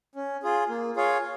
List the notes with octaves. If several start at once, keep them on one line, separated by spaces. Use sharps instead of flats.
C#4
F4 G#4
A#3
F4 G#4 C#5 F5